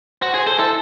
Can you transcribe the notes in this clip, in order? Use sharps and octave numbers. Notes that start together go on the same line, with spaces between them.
F#4 C5
G#4 C5
A4 C5
E4 A4